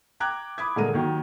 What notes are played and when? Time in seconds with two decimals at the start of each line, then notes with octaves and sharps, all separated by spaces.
0.20 G5 A#5 D6 F#6 G#6
0.58 B5 D6 D#6 G#6
0.76 D#1 D3 G#3 A#4 A#5 D#7
0.93 D#2 D#3 F#3